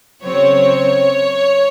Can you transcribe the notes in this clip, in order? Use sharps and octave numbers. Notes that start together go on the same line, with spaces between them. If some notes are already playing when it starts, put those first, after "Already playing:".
C#3 F#3 C4 C#5